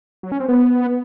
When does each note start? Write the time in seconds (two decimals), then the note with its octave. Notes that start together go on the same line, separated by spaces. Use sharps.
0.23 F#3
0.32 C#4
0.40 C4
0.48 B3